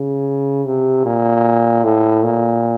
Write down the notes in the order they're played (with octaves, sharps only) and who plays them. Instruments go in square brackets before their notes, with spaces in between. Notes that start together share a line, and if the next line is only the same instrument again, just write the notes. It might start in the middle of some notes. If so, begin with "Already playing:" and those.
Already playing: [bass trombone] C#3
C3
A#2
A2
A#2